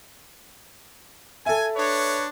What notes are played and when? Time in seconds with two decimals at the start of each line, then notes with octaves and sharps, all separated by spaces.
1.46 A4 E5 G#5
1.76 D4 B4 C#5